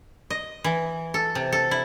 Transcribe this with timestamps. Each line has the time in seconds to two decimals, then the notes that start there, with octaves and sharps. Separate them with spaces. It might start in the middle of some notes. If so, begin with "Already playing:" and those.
0.30 D#5
0.64 E3
1.14 A4
1.35 C3
1.52 A4
1.71 E4